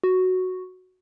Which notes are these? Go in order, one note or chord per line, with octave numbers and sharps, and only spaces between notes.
F#4